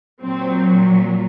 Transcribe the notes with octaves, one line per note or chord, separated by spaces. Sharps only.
A#2 F#3 C4